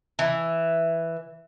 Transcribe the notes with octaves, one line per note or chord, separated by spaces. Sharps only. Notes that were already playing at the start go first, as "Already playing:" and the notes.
E3